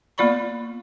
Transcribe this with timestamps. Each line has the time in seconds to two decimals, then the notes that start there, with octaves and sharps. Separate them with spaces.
0.18 A#3 B3 F4 D5 B5 C#6